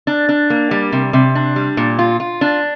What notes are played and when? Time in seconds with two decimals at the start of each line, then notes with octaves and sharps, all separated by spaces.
0.07 D4
0.29 D4
0.50 A#3
0.71 G3
0.92 C3
1.13 C3
1.35 D4
1.56 G3
1.77 A#2
1.99 F4
2.20 F4
2.41 D4